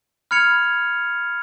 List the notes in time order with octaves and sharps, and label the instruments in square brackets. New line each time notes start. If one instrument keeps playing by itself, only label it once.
[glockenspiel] B5 F6 G#6 C#7 F7